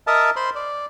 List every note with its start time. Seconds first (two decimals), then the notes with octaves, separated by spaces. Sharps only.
0.07 A#4 D#5 E5 A5
0.36 C5 B5 C6
0.55 D5